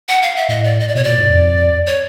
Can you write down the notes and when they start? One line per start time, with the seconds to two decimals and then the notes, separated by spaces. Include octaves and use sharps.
0.09 F#5
0.22 F5
0.36 E5
0.49 A2 D#5
0.64 D5
0.80 D#5
0.88 D5
0.95 B2 C#5
1.04 A#2 D5
1.18 G#2
1.30 F2
1.86 C#5